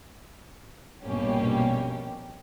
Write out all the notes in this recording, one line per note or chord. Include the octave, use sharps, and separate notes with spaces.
A#1 G2 B2 A#3 C#4 G4